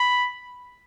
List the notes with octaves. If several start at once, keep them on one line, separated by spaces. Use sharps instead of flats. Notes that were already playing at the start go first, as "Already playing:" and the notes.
Already playing: B5